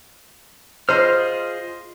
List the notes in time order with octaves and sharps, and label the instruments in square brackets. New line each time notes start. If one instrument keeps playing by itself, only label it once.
[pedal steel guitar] F4 G#4 F6 [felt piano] C5 D#5 C6